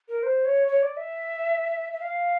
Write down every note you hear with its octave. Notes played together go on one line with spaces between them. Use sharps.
A#4
C5
C#5
C#5
D5
E5
E5
F5